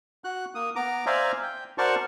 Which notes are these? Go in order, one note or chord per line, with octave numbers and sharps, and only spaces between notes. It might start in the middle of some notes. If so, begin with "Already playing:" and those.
F#4 F#6
A#3 D#6
B3 A#5 D6
C5 D5 E5 F5 G#5 A#5
G5
F#4 A#4 C5 D5 A5 C#6